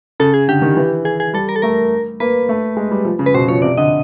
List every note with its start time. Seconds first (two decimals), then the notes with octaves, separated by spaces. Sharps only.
0.20 C#3 A4
0.34 G#4
0.48 D3 G4
0.62 D#3
0.77 E3
1.05 G#4
1.20 G#4
1.33 G3 A4
1.49 A#4
1.56 A4
1.62 A3 A#4
2.20 A#3 B4
2.49 A3
2.77 G#3
2.91 G3
3.05 F3
3.19 C#3
3.26 B4
3.34 B2 C5
3.48 F3 C#5
3.62 C3 D5
3.77 D3 D#5